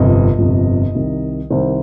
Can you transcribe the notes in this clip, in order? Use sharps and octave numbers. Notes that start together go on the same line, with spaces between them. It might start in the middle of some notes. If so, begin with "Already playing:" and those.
Already playing: G1 F2 C3 D#5
G1 F2 C3
C2 C3 D#3
C2 C3 D#3 C5